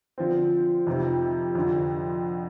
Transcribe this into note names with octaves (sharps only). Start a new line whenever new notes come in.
D3 F3 C4
F2 C3 F3 C4 D#4
F2 D3 F3